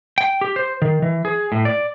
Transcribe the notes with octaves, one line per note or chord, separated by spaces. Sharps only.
G5
G4
C5
D#3
E3
G#4
A2
D5